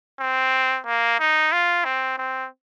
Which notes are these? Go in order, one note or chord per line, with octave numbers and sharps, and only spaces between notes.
C4
A#3
D#4
F4
C4
C4